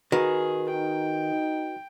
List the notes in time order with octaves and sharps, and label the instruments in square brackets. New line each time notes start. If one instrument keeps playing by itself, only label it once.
[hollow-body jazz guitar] D#3 [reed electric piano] F#4 B4 [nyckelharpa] G#4
[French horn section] D#4 [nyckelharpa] G5